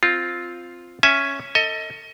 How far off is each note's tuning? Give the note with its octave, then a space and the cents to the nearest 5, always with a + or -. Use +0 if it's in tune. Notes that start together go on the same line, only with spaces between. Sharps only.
C4 +0 F4 +0
C#4 +0 E5 +0 G#5 +0
A4 +30 D#5 +25